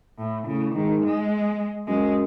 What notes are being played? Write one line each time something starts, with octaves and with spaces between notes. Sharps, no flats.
A2
A2 C#3
G#2 D#3
G#3
F#2 G#3